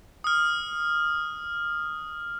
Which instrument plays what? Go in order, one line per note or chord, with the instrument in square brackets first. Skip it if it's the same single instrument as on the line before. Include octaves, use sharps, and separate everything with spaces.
[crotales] D#6 F6